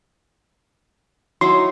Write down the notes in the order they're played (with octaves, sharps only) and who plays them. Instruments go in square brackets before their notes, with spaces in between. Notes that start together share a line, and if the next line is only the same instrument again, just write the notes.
[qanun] F#3 D#4 E4 [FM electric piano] C6